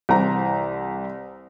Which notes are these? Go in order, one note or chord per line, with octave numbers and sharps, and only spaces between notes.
C2 E3 C5 A#5